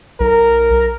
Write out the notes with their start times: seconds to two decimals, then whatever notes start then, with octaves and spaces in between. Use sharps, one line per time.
0.20 B1 A#4